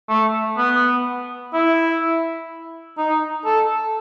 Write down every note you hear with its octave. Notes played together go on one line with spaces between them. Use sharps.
A3
B3
E4
D#4
A4